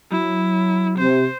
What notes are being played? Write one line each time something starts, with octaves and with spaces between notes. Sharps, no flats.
F#3 E4
C3 C5